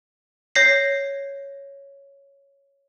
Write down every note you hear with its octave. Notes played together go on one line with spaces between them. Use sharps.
C#5 G6 A#6 C7